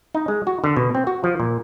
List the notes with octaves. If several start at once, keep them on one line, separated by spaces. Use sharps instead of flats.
D#4
G#3
F#4
D3
B2
C4
F#4
F3
A#2